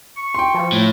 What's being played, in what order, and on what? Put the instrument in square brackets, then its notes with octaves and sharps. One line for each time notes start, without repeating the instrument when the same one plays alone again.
[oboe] C#6
[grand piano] G5 C6
[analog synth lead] F3
[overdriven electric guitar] A2